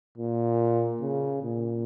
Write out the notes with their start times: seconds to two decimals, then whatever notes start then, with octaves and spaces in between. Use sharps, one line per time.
0.18 A#2
1.01 C#3
1.43 A#2